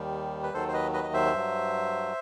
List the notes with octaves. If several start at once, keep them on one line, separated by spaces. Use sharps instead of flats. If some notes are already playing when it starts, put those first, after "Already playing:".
Already playing: D#2 D#3 G3
B4
D#2 D#3 F#3 A4 C5
C5
B4 D#5
B4 D#5
D#5
C5 E5
G2 F#3